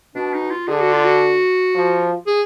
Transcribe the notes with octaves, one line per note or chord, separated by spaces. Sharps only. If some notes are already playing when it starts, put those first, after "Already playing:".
B2 D4
D#4
F4
D3 G#4
F#4
F4
F#4
F3
G#4